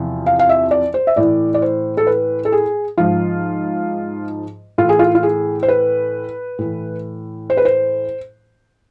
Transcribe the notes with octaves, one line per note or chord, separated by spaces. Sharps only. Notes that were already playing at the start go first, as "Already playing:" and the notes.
Already playing: E2 C3 F3
F5
F5
E5
D5
C5
E5
A2 E3 D5
D5
C5
A4
B4
A4
G#4
G#2 F3 F4
A2 E3 F4
G#4
F4
F4
G#4
C5
B4
A2 E3
C5
B4
C5